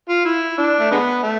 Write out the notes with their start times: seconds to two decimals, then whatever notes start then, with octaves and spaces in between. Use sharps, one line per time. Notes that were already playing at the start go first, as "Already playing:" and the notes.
0.09 F4
0.25 E4
0.58 D4
0.79 A3
0.91 D3 G#3 B3
1.23 A3